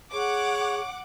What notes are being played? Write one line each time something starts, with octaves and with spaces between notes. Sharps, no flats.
G#4 C#5 F#5 D6